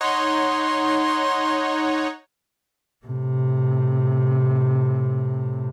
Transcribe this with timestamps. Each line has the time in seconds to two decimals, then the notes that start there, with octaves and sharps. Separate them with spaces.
0.01 D#4 C#5 F#5 C6
3.06 A2 C3